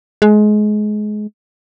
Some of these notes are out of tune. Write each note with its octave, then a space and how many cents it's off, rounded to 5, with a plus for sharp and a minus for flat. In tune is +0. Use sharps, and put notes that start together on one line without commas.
G#3 +25